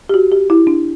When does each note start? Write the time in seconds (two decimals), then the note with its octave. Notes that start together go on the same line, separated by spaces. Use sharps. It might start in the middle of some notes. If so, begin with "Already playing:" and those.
0.09 G4
0.14 F#4
0.32 G4
0.50 E4
0.67 D4